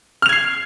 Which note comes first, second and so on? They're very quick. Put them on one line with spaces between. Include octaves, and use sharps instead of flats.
F6 F7 G#6 C7